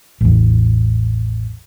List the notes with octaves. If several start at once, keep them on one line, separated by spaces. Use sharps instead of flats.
A1 E2